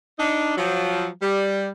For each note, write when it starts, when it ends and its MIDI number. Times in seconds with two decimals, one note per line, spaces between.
0.19 0.53 62
0.19 0.53 63
0.57 1.08 53
0.57 1.08 54
1.22 1.68 55